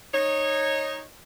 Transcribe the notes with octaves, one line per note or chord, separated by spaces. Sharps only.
D#4 C#5